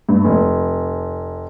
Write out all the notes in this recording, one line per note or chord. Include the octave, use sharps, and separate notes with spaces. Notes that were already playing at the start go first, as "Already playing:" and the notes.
G2
F1